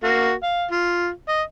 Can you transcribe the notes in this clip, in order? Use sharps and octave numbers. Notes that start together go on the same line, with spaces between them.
A#3 F#4
F5
F4
D#5